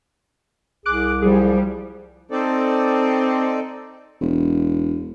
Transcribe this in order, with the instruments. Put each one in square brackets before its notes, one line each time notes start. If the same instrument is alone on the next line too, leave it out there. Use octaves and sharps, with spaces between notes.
[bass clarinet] C2 [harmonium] G#4 [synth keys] D6 F#6 D7
[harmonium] F3 [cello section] G3 [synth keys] G#4
[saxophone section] C4 [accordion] D#4 A4 D5
[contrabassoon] E1